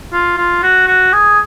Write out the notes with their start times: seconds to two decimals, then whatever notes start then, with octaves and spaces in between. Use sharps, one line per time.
0.12 F4
0.37 F4
0.63 F#4
0.88 F#4
1.13 G#4